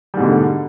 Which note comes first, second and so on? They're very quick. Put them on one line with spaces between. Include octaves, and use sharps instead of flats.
G3 G#2 B2 D3